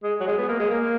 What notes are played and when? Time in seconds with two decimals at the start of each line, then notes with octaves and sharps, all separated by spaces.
0.03 G#3
0.21 F#3
0.27 G#3
0.38 B3
0.49 A#3
0.60 G#3
0.70 A#3